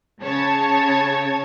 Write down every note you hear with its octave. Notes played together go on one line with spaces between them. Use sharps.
C#3 C#5 A5 G#6